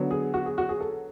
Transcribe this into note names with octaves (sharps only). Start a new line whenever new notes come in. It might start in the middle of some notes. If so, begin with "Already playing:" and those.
Already playing: D3 F#3 B3
G#4
F#4
G#4
F#4
G#4
A4